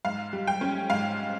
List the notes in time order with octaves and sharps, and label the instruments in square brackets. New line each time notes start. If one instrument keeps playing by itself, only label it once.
[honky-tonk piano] G#2 F5
G3
G5
C#4
G#2 F5